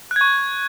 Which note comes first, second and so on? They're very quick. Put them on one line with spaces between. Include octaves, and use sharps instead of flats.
F#6 G#6 C#6